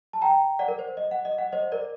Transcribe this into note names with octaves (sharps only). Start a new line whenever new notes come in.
A5
G5 A#5
D5 F#5
A#4
C5
D#5
F#5
D#5
F#5
C5 D#5
A#4 D5